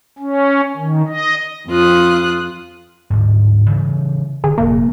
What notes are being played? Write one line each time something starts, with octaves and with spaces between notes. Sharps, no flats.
C#4
D#3
D#5
F2 F4 D#6 F#6
D1 G#2
C#3 E3 G3
D3 C#4 G#4
F1 A#2 A#3